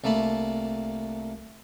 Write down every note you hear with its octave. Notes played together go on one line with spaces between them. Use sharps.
C2 A3 A#3 A5 B5